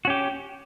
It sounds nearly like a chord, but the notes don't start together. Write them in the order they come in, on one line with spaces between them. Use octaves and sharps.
F#4 C#4 G4